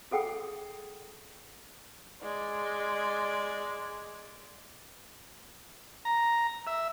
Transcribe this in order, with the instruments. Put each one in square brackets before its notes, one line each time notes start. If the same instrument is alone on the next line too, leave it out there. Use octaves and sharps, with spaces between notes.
[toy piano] G#4 A4 F#5 G5 D#6
[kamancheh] G#3 D5
[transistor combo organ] A#5
E5